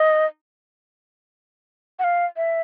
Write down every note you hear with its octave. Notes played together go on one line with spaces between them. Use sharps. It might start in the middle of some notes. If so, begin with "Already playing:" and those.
Already playing: D#5
F#5
F5
E5